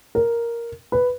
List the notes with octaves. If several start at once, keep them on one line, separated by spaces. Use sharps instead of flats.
A#4
B4